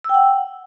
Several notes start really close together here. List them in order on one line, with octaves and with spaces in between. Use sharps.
E6 G5 F#5